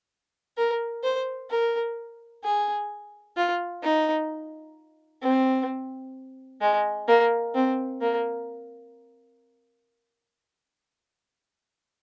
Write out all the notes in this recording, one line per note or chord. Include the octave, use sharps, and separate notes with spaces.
A#4
C5
A#4
G#4
F4
D#4
C4
G#3
A#3
C4
A#3